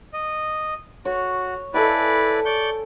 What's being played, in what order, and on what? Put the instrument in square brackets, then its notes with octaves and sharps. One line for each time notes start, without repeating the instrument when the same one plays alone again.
[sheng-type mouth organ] D#5
[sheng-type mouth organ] F#4 [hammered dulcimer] C#5
[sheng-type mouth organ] E4 B4 D5 [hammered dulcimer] A4 F5 G#5
[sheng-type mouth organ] D5 C#6 G6